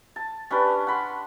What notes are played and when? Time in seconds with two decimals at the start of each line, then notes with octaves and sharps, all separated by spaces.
0.16 A5
0.51 C#4 D4 G4 B4
0.87 F#5 B5 C6